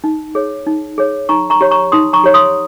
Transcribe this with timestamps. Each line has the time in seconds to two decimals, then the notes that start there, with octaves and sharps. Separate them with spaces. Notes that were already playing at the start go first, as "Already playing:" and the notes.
0.04 D#4
0.35 G#4 C#5
0.67 D#4
0.98 G#4 C#5
1.29 D#4 A#5 C#6
1.50 A#5 C#6
1.61 G4 C#5
1.71 A#5 C#6
1.92 D#4 C6 D#6
2.13 A#5 C#6
2.24 G4 C#5
2.34 C6 D#6